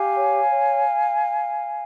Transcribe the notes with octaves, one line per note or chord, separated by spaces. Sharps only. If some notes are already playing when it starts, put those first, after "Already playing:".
Already playing: G4 F5 G#5
C#5
C#5